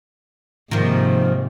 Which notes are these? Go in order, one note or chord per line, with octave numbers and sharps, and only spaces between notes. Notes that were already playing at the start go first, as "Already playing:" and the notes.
G#2 C3 D#3 F3 A#3